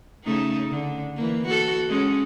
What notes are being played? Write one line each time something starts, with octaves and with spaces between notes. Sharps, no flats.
C#3 A3 D#4
D3
E3 A#3
F#4 A4
G#3 C#4